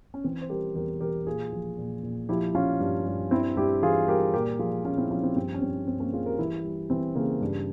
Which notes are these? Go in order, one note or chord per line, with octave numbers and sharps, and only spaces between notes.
C#4
E3 C4
C5
G3 G4 A#4
E2 G4 A#4
E3 G4 A#4
A#2 F4 G#4
F3
A#2
A#2
F3 E4 G4
F3 C#4 F4
G2
G2
G2 C4 E4
G2 E4 G4
E3 F4 G#4
G3 G4 A#4
A#2 G4 A#4
F3 F4 G#4
A#2 C#4 F4
C4 E4
F3 C#4 F4
C4 E4
G2 C4
C#4
G2 C4
G2 C4
A#3 C#4
G3 F4 G#4
G4 A#4
E3 E4 G4
G3
E3 C4 E4
C#3 A#3
G2